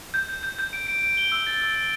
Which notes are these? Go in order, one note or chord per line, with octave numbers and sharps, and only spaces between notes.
G6
G6
G6
G6
D7
D7
D7
G7
E6
A6
E6
G7